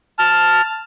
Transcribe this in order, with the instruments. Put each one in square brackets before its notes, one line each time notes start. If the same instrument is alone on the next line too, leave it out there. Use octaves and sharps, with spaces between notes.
[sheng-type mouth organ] A5 F6